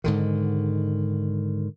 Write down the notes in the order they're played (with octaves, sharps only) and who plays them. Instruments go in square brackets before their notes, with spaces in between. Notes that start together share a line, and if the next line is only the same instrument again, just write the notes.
[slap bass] G#2 D3 D#3